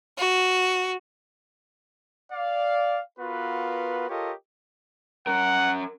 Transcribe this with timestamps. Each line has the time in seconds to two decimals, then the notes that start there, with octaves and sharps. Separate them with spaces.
0.19 F#4
2.32 D5 F5
3.19 B3 F4 F#4 A#4 B4
4.09 F4 G4 A4 A#4 C#5 D#5
5.27 C#4 A#4 F#5